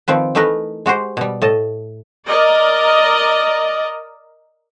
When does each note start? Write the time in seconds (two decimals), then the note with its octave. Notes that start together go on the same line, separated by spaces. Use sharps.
0.08 D#3 F3 C4 B4
0.35 E3 A3 D#4 A#4 B4
0.86 G#3 F#4 G4 C5
1.17 B2 G3
1.42 A2 D#5 A5
2.27 A#4 D5 D#5